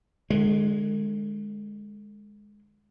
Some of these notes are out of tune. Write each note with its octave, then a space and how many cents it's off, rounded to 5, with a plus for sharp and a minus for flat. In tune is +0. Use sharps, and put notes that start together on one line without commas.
D3 +35 G#3 +0